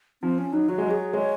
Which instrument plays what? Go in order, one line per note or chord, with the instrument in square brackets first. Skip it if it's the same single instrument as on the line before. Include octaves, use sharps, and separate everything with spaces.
[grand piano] F3 [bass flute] C4
[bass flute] C#4
[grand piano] F#3 [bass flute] D#4
[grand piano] F#3 [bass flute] F#4
[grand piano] G#3
[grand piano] F#3 [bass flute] G#4
[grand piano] G#3 [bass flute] C#5